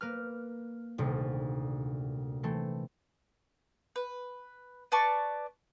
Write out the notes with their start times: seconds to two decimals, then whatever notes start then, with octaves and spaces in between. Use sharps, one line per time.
0.01 A#3 B4 F6
0.98 D#1 D2 C3
2.43 E3 A3 C4
3.96 B4
4.92 B4 D5 A5 C#6